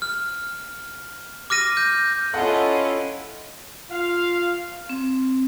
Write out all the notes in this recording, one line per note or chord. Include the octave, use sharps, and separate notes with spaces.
F6
D6 F6 A#6 D#7
G6
C#4 E4 F4 A4 D#5 F#5
F4 F5
C4